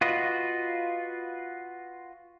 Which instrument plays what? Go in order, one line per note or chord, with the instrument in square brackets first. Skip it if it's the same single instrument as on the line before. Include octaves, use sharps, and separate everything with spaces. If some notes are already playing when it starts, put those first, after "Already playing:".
[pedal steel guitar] F4 F#4 B4 D#5